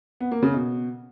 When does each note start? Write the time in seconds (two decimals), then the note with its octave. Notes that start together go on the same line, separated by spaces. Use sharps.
0.21 B3
0.32 A#3
0.43 C#3
0.54 B2